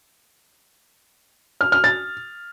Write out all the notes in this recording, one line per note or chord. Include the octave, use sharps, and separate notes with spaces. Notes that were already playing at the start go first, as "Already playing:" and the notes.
F6
F6
A6